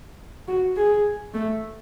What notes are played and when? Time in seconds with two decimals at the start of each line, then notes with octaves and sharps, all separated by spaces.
0.48 F#4
0.76 G#4
1.34 A3